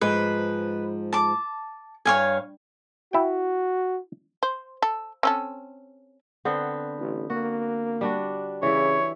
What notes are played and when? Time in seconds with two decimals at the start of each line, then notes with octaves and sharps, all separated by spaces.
0.01 G#2 F3 G#3 B4
1.13 A5 D6
2.05 G2 C#5 F5 G#5
3.13 E4 F#4 G5
4.43 C5
4.82 A4
5.23 C4 C#4 A4
6.45 D3 B3 C4
6.99 A1
7.30 A#3 F#4
8.01 G3 D4 F#4
8.63 C#3 E3 E4 C#5